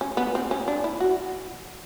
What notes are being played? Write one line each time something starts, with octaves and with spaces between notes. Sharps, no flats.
C#4
B3
C4
C#4
D4
E4
F#4